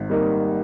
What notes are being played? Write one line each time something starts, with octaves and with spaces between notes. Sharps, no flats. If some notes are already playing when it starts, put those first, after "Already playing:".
Already playing: G#1
G3 A#3 D#4